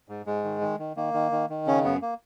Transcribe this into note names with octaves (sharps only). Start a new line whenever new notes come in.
G#2
G#2 G#3
D#3
D#3
D#3
D#3 A#3
D#3
D#3
D#3
C#3 C#4
F#2 B3
A#3